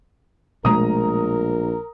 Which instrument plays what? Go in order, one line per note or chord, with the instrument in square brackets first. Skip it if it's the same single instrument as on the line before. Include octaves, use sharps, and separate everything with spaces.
[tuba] A#1 [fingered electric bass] B2 G#3 A3 [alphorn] A#4 [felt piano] A#5 D#6